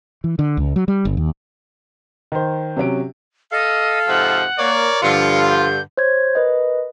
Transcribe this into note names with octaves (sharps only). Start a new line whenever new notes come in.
E3
D3
C#2
F#3
G3
G1
D#2
D#3 C5
C3 F#3 C#4 D7
A4 D#5 F5
G#2 C3 F3 F#5
A#3 A#4 C#5 D5
G2 D3 F3 F4 C#7
G6
C5 C#5 G#6
A#4 B4 D#5